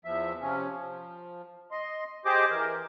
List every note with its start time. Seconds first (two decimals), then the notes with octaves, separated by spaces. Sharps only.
0.05 E2 F3 E5
0.41 C3 F3 C#4
0.69 F3
1.71 D#5 C6
2.25 G4 G#4 C5 D#5 D6
2.50 E3 A#4